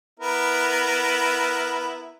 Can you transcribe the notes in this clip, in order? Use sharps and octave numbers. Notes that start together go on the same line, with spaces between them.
B3 E4 A#4